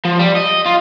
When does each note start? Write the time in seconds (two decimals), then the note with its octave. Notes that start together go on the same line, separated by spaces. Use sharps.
0.05 F3
0.20 G3
0.36 D#5
0.66 F4